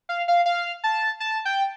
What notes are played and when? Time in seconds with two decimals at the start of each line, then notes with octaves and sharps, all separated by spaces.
0.09 F5
0.28 F5
0.46 F5
0.84 A5
1.20 A5
1.45 G5